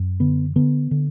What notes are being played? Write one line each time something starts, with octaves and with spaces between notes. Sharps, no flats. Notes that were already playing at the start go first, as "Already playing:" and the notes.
Already playing: F#2
D3 B3
D3 B3
D3